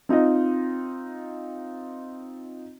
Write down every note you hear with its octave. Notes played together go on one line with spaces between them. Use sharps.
C4 D#4 F4 D#5